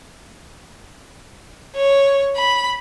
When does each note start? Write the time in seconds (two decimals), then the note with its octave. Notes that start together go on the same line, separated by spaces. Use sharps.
1.76 C#5
2.37 B5